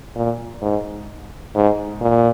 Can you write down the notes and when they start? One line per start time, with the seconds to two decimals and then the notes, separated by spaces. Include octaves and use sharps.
0.16 A#2
0.62 G#2
1.55 G#2
2.01 A#2